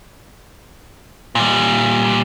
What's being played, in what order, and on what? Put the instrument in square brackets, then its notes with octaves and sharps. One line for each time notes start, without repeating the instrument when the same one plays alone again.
[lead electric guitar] A#2 G3